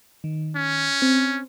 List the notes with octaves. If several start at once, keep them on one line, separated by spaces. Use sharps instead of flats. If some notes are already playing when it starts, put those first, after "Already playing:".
D#3
C#4
C4